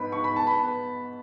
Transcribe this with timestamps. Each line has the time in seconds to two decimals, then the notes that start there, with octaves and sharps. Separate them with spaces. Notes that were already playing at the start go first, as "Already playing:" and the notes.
Already playing: G#2 B3 B5
0.12 G#2 C#6
0.24 B5
0.36 B3 A5
0.47 B5
0.63 B3